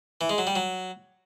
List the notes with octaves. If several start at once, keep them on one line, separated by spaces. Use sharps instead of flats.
E3
G#3
F#3
G3
F#3